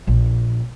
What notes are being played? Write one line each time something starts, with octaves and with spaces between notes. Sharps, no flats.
A#1